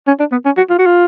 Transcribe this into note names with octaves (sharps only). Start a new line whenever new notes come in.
C#4
D4
B3
C#4
F#4
F4
F#4
F4